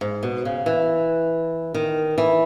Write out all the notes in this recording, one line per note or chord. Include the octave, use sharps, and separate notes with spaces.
G#2
B2
C#3
E3
D#3
E3